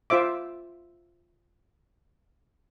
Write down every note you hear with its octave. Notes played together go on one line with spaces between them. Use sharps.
F4 C5 E5 D6